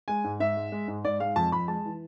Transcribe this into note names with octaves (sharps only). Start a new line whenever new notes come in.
G#3 G#5
G#2
G#2 E5
G#3
G#3
G#2
G#2 D5
G#3 F5
F2 A5
F2 B5
G#3 A5
E3